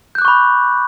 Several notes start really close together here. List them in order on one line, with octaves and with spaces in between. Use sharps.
G6 F#6 D6 C#6 B5